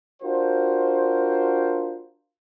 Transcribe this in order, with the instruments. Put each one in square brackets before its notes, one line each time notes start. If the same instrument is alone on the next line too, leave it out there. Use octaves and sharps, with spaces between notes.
[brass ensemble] D4 F4 F#4 A#4 C5